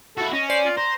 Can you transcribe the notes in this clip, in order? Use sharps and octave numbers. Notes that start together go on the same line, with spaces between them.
E4 F#4 A4
C#4 D#5
C5 D5
F4
C5 A#5